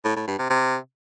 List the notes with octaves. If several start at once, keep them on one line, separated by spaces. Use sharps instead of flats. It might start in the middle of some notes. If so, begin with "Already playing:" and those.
A2
A2
G2
C3
C3